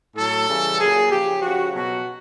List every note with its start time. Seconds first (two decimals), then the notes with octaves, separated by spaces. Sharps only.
0.16 A2 F#3 A4
0.47 C#3 E3 G3
0.79 A#2 F#3 G#4
1.10 C#3 F3 G4
1.41 C#3 F3 F#4
1.72 B2 F#3 F#4